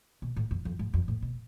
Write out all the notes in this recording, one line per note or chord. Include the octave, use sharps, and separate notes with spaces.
B2
A2
F2
F2
G#2
F2
A2
B2